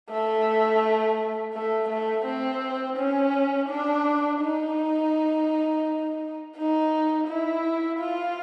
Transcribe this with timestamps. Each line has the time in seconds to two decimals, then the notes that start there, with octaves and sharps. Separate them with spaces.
0.10 A3
1.54 A3
1.89 A3
2.25 C4
2.97 C#4
3.68 D4
4.41 D#4
6.56 D#4
7.27 E4
7.99 F4